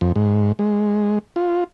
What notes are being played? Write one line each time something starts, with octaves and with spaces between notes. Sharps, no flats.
F2
G#2
G#3
F4